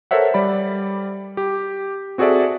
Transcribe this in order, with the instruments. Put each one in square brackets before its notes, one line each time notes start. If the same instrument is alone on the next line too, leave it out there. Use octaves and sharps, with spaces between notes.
[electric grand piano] A4 A#4 C5 C#5 E5 F#5
G3 D5 B5
G4
C4 F#4 G#4 A4 D5 E5